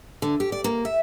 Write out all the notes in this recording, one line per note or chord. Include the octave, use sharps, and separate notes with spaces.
D3
G4
D5
A#3
E5